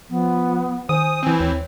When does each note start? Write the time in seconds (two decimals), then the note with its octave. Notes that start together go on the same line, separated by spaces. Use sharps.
0.09 F3 B3
0.89 D#3 C5 G#5 D#6
1.23 E3 C4
1.40 D#2 C#5